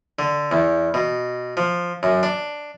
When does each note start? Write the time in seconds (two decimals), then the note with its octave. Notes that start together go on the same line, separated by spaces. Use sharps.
0.19 D3
0.51 E2
0.94 B2
1.57 F3
2.03 F#2
2.23 D4